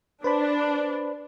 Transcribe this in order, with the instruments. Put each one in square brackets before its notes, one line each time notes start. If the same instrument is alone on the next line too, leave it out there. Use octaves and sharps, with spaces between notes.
[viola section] D4 [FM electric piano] B4 C5 B5